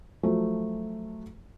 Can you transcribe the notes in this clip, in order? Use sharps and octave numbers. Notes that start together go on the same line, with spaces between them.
F3 F#3 A3